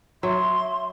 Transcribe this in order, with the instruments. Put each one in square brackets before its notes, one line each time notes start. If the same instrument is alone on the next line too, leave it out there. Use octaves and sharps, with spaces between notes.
[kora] F#3 [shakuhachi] E5 [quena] C6